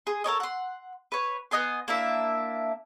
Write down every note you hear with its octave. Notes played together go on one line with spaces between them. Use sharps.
G#4 C6
A4 A#4 C#5 D#5
F#5 C6
B4 C#5
B3 D#5 G#5 C6
A#3 D4 E4 E5